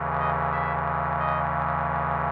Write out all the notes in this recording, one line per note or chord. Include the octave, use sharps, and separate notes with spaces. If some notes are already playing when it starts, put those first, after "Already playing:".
Already playing: D#2 C#3 E3
D#5
E5
D#5